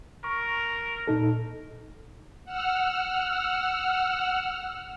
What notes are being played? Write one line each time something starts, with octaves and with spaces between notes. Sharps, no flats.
A#4 C#6
A#2 D#4 A4
F#5 E6 F6